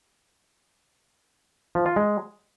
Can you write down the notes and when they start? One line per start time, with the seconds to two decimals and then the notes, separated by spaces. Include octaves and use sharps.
1.75 F3
1.86 F4
1.96 G#3